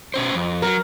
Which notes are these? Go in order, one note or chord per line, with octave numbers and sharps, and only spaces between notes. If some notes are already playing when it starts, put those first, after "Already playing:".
B2 C#4 C5
F2
F#3 A#4